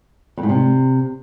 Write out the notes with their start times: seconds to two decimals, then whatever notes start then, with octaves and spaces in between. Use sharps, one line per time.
0.37 F2
0.43 G#2
0.49 C3